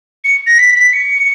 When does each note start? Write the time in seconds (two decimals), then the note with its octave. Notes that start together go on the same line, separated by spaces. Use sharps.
0.24 C#7
0.47 A#6
0.58 B6
0.76 B6
0.93 C#7